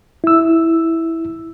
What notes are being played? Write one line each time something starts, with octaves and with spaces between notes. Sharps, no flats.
E4 E6